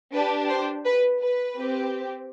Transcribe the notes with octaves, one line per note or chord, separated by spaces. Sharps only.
D4 G4 B4
C5
B4
B4
C4 G4